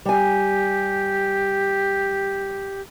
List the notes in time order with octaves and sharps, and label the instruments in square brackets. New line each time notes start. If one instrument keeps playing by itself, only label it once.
[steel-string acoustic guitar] G3 G#5 [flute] G4